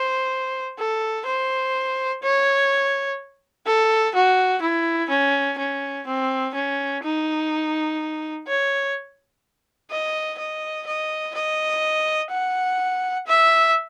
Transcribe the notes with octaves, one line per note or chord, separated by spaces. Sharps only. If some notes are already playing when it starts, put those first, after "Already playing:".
Already playing: C5
A4
C5
C#5
A4
F#4
E4
C#4
C#4
C4
C#4
D#4
C#5
D#5
D#5
D#5
D#5
F#5
E5